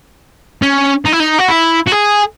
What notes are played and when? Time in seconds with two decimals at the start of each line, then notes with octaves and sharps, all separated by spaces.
0.62 C#4
1.05 D#4
1.13 E4
1.20 D#4
1.39 F#4
1.48 E4
1.87 F#4
1.92 G#4